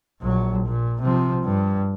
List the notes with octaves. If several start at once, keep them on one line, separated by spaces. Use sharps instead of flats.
A#1 F#3
A#2
C3 F3
G2